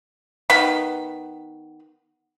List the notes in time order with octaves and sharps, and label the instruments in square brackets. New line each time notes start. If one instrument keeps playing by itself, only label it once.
[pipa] D#3 B3 B5